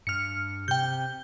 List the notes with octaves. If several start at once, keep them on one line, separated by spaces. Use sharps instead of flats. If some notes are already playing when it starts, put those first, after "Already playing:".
G2 F6 C#7
C3 G5 G6